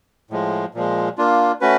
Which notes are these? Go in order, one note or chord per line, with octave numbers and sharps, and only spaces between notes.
A2 F3 G#3
A#2 F3 G#3
A#3 D4 F4
A3 C#4 F#4 B4